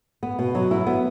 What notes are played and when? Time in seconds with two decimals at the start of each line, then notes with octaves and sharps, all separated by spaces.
0.23 B3
0.39 B2
0.55 F#3
0.71 E4
0.86 B3